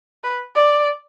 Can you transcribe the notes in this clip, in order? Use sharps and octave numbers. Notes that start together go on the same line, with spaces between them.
B4
D5